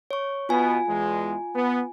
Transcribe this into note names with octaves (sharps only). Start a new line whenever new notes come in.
C#5 C#6
B2 B3 F4 G#5
E2 G#3
B3